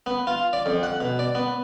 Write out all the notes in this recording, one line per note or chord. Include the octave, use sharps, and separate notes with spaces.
B3
F4
D5
F2
F#5
B2
D5
B3